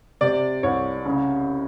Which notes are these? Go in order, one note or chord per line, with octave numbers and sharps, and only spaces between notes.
C3 D5
C2 C#5
C#3